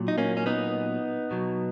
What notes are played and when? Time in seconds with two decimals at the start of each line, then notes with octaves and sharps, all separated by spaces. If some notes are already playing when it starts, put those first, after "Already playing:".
Already playing: A#2 F#3
0.08 D#4
0.18 A#3 C#4
0.37 C#4
0.46 B3 D#4
1.31 B2 F#3